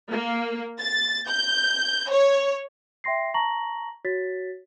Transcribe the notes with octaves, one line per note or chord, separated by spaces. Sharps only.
A#3
A6
G6
C#5
E5 G5 C6 A#6 C7
A5 A#5 C#6 A#6 F#7
F#4 C#5 A6 B6